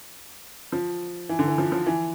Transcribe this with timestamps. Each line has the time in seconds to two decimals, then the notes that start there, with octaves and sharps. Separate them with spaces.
0.72 F3
1.29 E3
1.39 D3
1.48 E3
1.58 F3
1.72 F3
1.86 E3